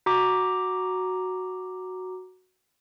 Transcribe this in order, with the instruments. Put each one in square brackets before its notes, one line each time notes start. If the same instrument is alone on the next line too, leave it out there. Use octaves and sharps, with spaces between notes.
[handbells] F#4 A#5 D6